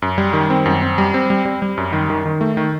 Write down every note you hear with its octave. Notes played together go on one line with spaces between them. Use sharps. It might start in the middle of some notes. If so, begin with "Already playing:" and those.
F#2
G3
D#3
C4
F#2
C4
G3
C4
G3
G3
G3
F#2
D#3
D#3
D#3
A3
D#3